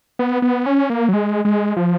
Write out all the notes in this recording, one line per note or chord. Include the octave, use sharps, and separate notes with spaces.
B3
B3
C#4
A#3
F#3
G#3
G#3
F3